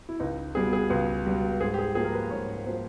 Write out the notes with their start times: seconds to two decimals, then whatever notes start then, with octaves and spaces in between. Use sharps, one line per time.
0.09 E4
0.20 C#2 D#4
0.55 B2 G3 B3 G#4
0.73 G#4
0.90 C#2
1.26 B2 G3 B3
1.60 G#2 G#4
1.74 G4
1.79 G#4
1.95 F3 A#3 G#4
2.04 A#4
2.14 B4
2.31 G#2 C#5
2.66 F3 A#3 C5